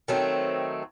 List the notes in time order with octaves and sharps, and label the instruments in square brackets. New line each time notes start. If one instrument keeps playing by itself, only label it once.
[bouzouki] D#3 F#3 A3 C4